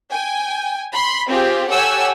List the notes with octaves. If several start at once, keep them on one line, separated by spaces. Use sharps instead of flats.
G5 G#5
B5 C6
C4 F4 G4 G#4
G4 A4 C#5 F#5 G#5 E6